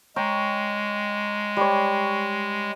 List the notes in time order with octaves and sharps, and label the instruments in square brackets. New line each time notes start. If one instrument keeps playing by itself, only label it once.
[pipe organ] G#3 [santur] C#5 G5 A#5
[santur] G3 C#5